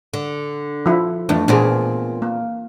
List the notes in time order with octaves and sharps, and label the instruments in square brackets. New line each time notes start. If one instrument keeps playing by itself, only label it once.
[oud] D3
[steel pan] F3 E4
[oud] F2 A3 [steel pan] E3 D4
[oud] A#2 B3 C4 [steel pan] D4 G#4
[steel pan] A#3